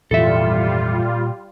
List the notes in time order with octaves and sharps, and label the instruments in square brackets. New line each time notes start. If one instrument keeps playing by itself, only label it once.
[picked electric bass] G#1 F2 E3 [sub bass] A#2 [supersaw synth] G3 F4 [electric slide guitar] A4 E5